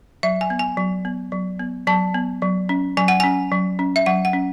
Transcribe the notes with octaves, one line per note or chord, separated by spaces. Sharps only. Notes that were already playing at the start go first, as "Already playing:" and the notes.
F#3 E5
G#5
B3
G#5
F#3
B3
F#3
B3
F#3 A5
B3
F#3
C#4
F#3 G#5
F#5
C#4 G#5
F#3
C#4
E5
F#3 F#5
F#5
C#4